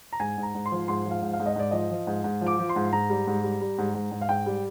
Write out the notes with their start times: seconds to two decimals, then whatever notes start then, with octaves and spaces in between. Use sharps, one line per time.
0.13 A#5
0.20 G#2 G#5
0.38 G#2
0.43 A#5
0.55 G#2
0.66 C6
0.72 F3
0.88 G#2 C6
1.06 F3
1.11 F5
1.22 G#2
1.33 F5
1.39 G#2
1.46 D#5
1.56 G#2 D5
1.71 F3 D#5
1.91 F3
2.07 G#2
2.24 G#2
2.41 F3
2.47 D6
2.59 F3
2.69 C6
2.76 G#2
2.93 G#2 A#5
3.10 G3
3.27 G#2
3.43 G3
3.61 G3
3.78 G#2
3.94 G#2
4.11 G#2
4.21 F5
4.29 G#2 G5
4.46 G3